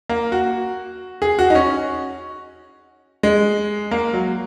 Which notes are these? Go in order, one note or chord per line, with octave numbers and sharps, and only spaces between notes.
A#3
F#4
G#4
F#4
D#4
C#4
G#3
A#3
F#3